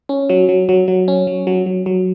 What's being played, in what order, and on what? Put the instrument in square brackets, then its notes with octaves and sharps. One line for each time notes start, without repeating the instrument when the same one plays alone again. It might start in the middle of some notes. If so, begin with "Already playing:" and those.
[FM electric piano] C#4
F#3
F#3
F#3
F#3
C#4
F#3
F#3
F#3
F#3